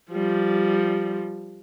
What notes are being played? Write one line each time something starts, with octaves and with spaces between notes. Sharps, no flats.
F3 G3